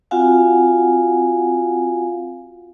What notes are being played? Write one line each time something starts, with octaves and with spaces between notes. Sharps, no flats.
C4 F4 F#4 F5 F#5 G#5